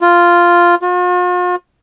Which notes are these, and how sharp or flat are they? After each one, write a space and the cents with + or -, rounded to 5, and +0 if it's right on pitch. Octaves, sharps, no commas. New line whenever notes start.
F4 -5
F4 +45